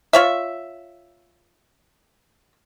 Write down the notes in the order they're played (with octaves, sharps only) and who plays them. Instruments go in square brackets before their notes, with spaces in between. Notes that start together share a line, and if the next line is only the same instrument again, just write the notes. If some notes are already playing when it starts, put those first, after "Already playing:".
[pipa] F4 C#5 E5